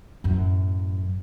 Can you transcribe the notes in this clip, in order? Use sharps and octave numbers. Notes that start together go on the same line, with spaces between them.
F#2 A2